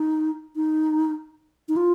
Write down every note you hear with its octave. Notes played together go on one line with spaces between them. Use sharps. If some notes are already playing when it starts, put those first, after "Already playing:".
Already playing: D#4
D#4
D#4
F4